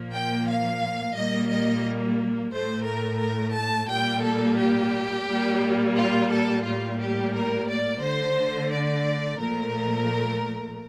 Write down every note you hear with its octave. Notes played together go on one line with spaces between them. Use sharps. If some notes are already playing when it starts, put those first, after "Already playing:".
Already playing: A#2 F3 A#3
G5
F5
A#2 G3 A#3 D#5
D#5
A2 A3 C5
A#4
A#4
A5
A#2 G3 A#3 G5
A4
G4
A#2 G3 A#3
F4
A4
A2 G3 A#3 F4
G4
A#4
D5
D3 A3 C5
D5
A#2 F3 A3 A#4